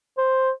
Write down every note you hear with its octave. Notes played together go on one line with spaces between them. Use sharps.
C5